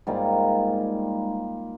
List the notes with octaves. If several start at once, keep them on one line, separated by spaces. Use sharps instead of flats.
G#2 G3 A#3 F4